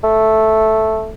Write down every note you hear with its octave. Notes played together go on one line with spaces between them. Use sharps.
A3